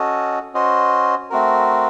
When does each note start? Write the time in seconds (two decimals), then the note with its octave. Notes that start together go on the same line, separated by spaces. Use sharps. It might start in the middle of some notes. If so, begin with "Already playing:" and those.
Already playing: C#4 F#4 A4 D#5
0.54 C#4 F#4 C5 D#5
1.30 A3 C4 F#4 A#4